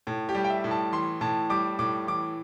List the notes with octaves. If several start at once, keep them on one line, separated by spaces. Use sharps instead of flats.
A2
G4
G3
G5
E5
A2
A5
E3 C6
A2 A5
G3 D6
A2 D6
E3 D6